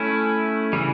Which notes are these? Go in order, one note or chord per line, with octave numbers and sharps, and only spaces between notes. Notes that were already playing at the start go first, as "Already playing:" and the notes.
Already playing: A3 C#4 E4
C#3 E3 G3